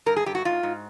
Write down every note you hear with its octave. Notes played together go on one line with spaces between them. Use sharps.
G2 A#4
G#4
G2 G4
F#4
G#2 F4
G#2